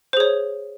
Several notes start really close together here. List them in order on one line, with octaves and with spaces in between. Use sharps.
C5 G#4 C#5